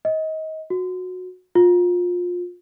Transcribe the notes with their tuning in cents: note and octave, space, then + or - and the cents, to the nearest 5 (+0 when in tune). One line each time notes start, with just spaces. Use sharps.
D#5 +25
F#4 -15
F4 +25